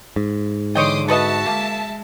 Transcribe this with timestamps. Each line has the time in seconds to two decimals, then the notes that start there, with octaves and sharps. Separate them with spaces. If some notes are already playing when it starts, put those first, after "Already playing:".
0.16 G#2
0.75 D3 E3 C#5 D#5 G5 C6 D6 D#6
1.08 F#4 A4 B4 D#5 E5 A5
1.46 G#3 A#3